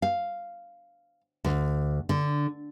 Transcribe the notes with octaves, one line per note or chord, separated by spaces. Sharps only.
F5
D2
D3